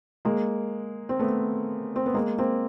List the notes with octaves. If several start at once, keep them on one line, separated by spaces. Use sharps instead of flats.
G#3 A#3
C4
A3 B3
C4
B3
G#3 A#3
A#3 C4